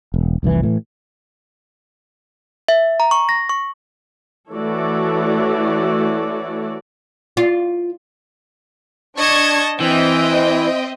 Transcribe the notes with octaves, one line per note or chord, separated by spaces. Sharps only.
E1
F1 C2 G#2 E3
A2 E3
E5
A#5
C#6
A#6
C#6
E3 A3 F#4 A4 C#5 D5
F4
D4 D#5 A5 C#6 G#6
E3 C4 D#5 E5 G5